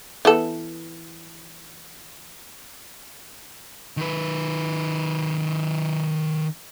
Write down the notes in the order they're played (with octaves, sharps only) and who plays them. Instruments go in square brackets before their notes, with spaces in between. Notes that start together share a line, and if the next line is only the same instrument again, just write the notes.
[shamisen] E3 B3 A4
[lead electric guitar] D#3 B4